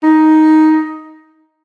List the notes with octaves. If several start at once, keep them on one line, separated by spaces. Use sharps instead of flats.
D#4